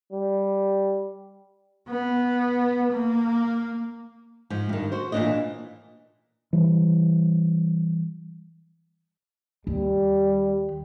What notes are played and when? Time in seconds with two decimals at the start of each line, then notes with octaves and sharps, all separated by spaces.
0.12 G3
1.89 B3
2.92 A#3
4.50 G#2 F3
4.69 G2 D#3
4.92 F#4 C5
5.12 A#2 E3 F3 D4 F4 D#5
6.53 E3 G3
9.67 D#2 G3